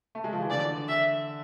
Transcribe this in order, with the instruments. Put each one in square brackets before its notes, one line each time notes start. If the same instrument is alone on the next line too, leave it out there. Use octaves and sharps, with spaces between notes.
[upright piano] A3
G#3
F3
E3
[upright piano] D3 [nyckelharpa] D5
[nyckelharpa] E5